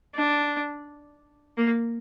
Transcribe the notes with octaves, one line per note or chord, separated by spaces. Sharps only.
D4
A#3